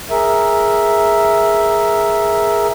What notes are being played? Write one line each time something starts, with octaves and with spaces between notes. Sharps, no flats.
G#4 A#4 E5